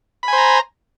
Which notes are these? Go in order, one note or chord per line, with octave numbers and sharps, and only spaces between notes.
C5 G#5 A#5 B5